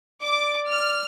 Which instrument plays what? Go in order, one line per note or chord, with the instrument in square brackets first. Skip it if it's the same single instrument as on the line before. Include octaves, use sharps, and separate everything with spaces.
[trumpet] D5 [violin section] D6
[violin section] F6